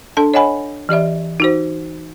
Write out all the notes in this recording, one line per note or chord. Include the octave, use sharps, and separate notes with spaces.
D4 A4 A5
C#5 D#5 F#5 G#5 B5
E3 G4 D5 E5
D#4 F#4 C5